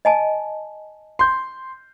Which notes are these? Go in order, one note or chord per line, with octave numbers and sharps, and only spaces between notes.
D#5 G#5 A5
C6 G6